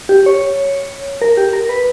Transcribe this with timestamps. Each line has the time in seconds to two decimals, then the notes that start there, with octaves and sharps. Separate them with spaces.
0.09 G4
0.26 C#5
1.22 A#4
1.37 G4
1.53 A#4
1.69 B4